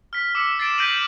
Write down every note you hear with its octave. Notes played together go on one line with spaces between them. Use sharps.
F6 B6
D6 E6 B6 C#7
A6 C7 D7 E7
G6 A#6 B6 D7 D#7 F#7